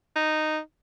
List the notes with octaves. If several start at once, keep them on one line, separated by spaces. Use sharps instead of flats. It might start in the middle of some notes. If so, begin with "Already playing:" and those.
D#4